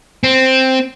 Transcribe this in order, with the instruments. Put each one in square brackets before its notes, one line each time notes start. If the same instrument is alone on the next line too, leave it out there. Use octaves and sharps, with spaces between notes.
[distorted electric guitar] C4